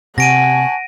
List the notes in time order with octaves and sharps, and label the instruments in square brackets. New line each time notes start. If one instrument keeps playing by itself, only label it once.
[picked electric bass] C3 [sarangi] F#5 [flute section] G#5 A5 C#6 [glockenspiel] A#6 D7 D#7